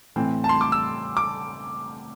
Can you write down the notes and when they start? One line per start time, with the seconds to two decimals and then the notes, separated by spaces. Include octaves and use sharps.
0.16 A2 E3 C4
0.44 A5
0.49 C6
0.61 D6
0.72 E6
1.17 D6